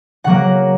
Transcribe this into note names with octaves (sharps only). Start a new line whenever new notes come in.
C#3 F#3 A#3 F#5